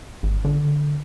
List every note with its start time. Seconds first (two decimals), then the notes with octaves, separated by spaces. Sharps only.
0.23 G#1
0.45 D3